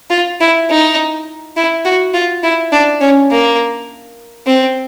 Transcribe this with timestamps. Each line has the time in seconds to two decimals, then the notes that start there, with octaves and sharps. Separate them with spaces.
0.10 F4
0.40 E4
0.70 D#4
1.56 E4
1.85 F#4
2.14 F4
2.43 E4
2.72 D4
3.00 C#4
3.31 A#3
4.46 C4